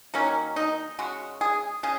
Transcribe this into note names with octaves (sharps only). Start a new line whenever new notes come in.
D#3 F#3 A#3 C#4
D#4
C#3 G#3 F#4
G#4
C#3 G#4